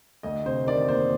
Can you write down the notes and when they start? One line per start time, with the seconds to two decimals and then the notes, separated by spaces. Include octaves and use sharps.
0.23 D2 D#5
0.46 C3 C5
0.67 D#3 D5
0.88 A#3 C5